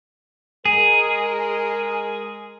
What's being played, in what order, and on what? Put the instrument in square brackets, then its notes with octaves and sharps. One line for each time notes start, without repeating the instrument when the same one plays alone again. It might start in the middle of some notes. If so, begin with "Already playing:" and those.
[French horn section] G#3 A#4 [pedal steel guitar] G#4